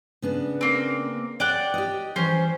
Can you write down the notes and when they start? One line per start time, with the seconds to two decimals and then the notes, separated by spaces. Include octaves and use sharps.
0.22 C#3 B3 D4
0.61 A#3 C4
1.40 C#5 D5 F#5 G5 F#6
1.74 G4 D#5
2.16 E3 G3 C#4 C5